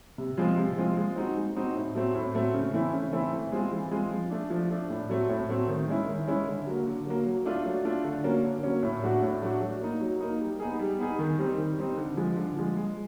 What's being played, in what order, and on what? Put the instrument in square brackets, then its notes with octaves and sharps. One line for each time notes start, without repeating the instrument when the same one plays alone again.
[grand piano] C3
F3 G#3 C4 F4
C3
F3 G#3 C4 F4
G#3
C4 D#4 F#4
G#3
C4 D#4 F#4
A2
F#3 A3 C4
A2
F#3 A3 C4
C#3
E3 A3 C4 E4
C#3
E3 A3 C4 E4
E3
G#3 C4 F4 G#4
E3
G#3 C4 F4 G#4
F3
A3 D4
F3
A3 D4
A2
F#3 A3 C4
A2
F#3 A3 C4
D#3
G#3 C#4 E4
D#3
G#3 C#4 E4
D3
F#3 A#3
D3
F#3 A#3
F#3
A3 D4 F4
F#3
A3 D4 F4
D3
F#3 A#3 C#4
D3
F#3 A#3 C#4
A2
F#3 A3 D4 F#4
A2
F#3 A3 D4 F#4
F#3
A#3 D#4
F#3
A#3 D#4
G3
B3 D#4 G#4
G3
B3 D#4 G#4
D#3
G3 C4 D#4
D#3
G3 C4 D#4
D3
F3 G#3
D3
F3 G#3
G#3